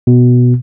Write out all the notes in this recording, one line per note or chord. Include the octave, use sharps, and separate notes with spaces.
B2